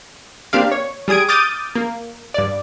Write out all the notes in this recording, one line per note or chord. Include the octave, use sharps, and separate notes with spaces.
A#3 C4 D4 G4 D5 F5
C#5
G3 G#4 D#6 G#6 D7
D6 D#6 F6 G6 A6 D#7
A#3
G2 D5